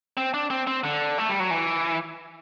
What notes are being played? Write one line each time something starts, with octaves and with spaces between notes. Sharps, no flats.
C4
D4
C4
C4
D3
A3
G3
F#3
E3